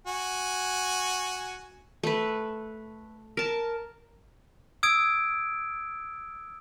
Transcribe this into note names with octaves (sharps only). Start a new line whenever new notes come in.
F#4 G#5
A3 B4
A#4 A5
D#6 E6 G#6 D7